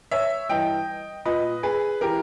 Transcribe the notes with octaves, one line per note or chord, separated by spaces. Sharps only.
C#5 E5
G2 E3 D#5 G5
A#2 B4 D#5
G#4 B4
E3 G4 A#4